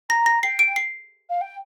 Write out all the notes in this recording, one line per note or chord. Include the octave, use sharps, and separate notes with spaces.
A#5 A#6
A#6
G5 C7
D7
C7
F5
G5